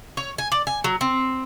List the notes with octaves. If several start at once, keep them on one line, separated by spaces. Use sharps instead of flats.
C#5
G#5
D5
G#5
F#3
C4